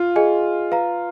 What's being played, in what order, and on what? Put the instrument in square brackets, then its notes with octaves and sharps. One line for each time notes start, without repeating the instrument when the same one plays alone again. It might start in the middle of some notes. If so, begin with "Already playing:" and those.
Already playing: [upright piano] F4
[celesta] G#4 D#5 G#5
B4 F5 A#5